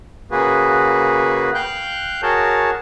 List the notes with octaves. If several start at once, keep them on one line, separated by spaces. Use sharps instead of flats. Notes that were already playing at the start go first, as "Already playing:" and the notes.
C#3 A#3 F#4 G#4 B4
F5 G5 F#6 G6
F#4 G#4 A#4 C#5 A5